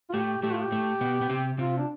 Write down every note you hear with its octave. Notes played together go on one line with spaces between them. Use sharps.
F4
A2 A3 G4
A2 A3 G4
F4
G4
A2 A3
B2 B3
B3
C3 C4
C3 C4 F4
D4